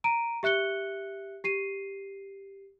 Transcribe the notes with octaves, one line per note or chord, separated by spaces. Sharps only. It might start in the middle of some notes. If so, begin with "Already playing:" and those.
A#5 D7 D#7
G4 E5 F#6 C#7 G7
G4 C7 D#7